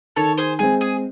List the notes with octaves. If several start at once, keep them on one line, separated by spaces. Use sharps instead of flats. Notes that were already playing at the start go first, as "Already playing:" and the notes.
D#3 A4 C#5
G#4 C5
G#3 C4 G#4
G#4